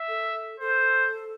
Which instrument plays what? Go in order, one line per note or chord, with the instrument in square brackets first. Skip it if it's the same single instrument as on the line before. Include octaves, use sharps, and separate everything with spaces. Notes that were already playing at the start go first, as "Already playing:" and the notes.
Already playing: [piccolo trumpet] E5
[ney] A4
[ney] A4 [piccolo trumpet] C5